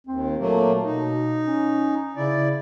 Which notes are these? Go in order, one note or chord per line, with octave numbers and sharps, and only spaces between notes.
D#2 C4
A#2 F#3 A3 A#3
B2 D#4
C#4
C#3 E4 D5